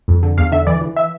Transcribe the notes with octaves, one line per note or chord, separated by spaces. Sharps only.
F2
D3
E2 F5
D3 E5
E3 D5
E3
E5